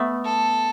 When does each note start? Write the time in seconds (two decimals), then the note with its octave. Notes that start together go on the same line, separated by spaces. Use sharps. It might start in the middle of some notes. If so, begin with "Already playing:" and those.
Already playing: A3 B3
0.25 A4